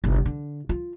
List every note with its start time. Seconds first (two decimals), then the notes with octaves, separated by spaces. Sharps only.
0.04 G1 C2
0.26 D3
0.69 F4